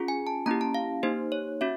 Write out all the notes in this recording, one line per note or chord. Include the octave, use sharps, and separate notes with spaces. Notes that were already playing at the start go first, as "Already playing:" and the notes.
Already playing: C#4 F4 G#4
G#5
A5
A#3 C#4 E4 G4 A#5
A5
F5
A#3 D#4 G4 C5
C#5
C#4 F#4 E5